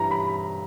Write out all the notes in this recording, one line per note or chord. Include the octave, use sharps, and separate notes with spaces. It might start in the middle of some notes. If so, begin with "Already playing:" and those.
Already playing: G2 E3 G3 A#5
B5